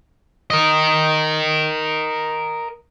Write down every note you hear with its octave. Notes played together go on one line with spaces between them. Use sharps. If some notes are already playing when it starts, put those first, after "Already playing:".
A#4 D#5